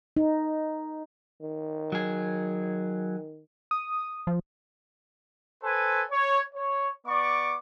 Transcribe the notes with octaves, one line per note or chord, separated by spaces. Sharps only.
D#4
D#3
F#3 G#4
D#6
F3
A4 B4 C5 G#5
C#5
C#5
B3 D5 C#6 D6